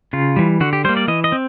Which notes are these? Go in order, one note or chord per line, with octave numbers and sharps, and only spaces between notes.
C#3 F4
E3 G3
D3 F#4
G4
G3 A#3 C5
D5
E3 D#5
D#5
C4